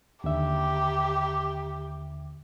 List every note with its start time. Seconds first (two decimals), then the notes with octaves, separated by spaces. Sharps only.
0.24 D#2 D3 G4 E5